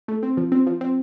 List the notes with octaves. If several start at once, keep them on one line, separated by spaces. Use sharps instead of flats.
A3
C4
F3
C4
F3
C4